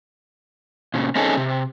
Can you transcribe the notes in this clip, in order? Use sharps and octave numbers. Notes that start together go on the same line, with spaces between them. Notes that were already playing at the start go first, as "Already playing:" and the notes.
A#2 C#3
C4 C#4 D#4 G#4 A4
C3